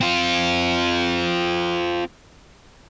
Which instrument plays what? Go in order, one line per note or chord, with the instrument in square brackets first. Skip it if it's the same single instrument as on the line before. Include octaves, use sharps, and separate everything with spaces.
[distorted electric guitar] C4 F4